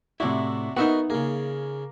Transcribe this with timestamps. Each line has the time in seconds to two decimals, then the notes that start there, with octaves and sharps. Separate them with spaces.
0.20 A2 C3 D4 E4 F#4 E5
0.77 B3 D#4 F#4 A#4 D#5 E5 F#5
1.10 C#3 A#3 G#4